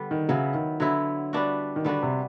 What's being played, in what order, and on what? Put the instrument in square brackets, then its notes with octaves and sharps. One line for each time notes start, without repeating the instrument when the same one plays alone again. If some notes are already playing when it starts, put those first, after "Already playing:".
Already playing: [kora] D3 G3 B3
[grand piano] D#3
[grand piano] C#3 [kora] F#3 B3 E4
[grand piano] D#3
[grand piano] D3 [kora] F#3 B3 E4
[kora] G3 B3 D4 F#4
[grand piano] D#3
[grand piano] D3 [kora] G3 B3 D4 F#4
[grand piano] C3